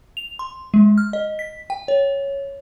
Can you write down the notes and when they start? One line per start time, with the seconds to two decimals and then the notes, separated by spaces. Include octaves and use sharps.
0.17 F7
0.39 C6
0.74 G#3
0.98 F6
1.13 D#5
1.39 B6
1.70 G5
1.88 C#5